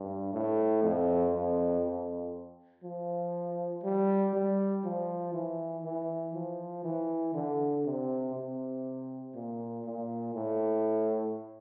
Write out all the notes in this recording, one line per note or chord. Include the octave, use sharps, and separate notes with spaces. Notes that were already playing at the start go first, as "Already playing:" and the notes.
Already playing: G2
A2
F2
F2
F2
F3
G3
G3
F3
E3
E3
F3
E3
D3
C3
C3
A#2
A#2
A2